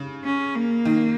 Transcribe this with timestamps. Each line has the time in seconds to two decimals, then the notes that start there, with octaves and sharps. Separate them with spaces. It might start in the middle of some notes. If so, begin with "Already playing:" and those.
Already playing: C#3
0.25 C#4
0.55 A#3
0.85 D#3